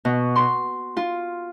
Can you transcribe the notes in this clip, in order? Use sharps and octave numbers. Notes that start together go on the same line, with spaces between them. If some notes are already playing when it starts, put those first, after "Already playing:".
B2
C6
F4